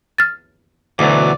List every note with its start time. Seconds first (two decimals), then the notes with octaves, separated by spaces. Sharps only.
0.18 F6 A6
0.99 D2 B2 E3 F#3 D5